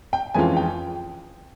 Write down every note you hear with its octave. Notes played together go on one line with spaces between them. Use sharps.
G5
F2 E3 G#3 C#4 F4 G#5
G5